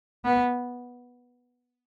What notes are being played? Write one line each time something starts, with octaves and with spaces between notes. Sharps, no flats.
B3